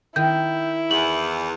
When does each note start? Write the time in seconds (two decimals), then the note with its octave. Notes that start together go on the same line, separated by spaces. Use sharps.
0.16 D#3 E4 G6
0.91 E2 F#7